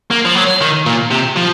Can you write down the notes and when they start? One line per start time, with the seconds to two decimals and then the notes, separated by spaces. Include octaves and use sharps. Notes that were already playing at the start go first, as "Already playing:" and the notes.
0.11 A#3
0.25 F3
0.35 F#3
0.61 D#3
0.86 A#2
1.11 C3
1.37 F3